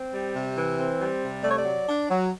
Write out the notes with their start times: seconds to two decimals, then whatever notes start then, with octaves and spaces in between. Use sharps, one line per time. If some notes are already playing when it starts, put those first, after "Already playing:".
Already playing: C4
0.13 G3
0.35 C3
0.57 E3
0.78 C4
1.00 G3
1.22 C3
1.43 A3 D5
1.51 C#5
1.59 D5
1.64 F#3
1.87 D4
2.09 F#3